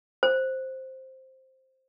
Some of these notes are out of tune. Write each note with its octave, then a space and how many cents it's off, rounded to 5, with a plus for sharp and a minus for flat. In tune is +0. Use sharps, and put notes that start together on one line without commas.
C5 +5